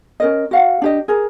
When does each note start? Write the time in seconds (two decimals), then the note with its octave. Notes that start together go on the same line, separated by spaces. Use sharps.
0.20 C#4 A#4 D#5
0.51 F#4 F5 F#5
0.82 D4 G4 D#5
1.08 G#4 A#4